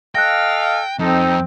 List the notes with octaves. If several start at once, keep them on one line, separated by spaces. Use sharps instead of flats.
A4 D#5 F5 G5 F#6 A#6
F2 C4 D#4 A4